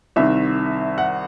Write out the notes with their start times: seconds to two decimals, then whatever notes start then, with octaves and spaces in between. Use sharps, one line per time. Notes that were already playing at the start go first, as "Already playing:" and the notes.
0.16 C2 C3 D#3 E5
0.98 F#5